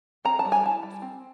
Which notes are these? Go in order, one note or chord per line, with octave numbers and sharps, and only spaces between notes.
C4 A#5
A5
G3
G#5
E4 A5
G3
C4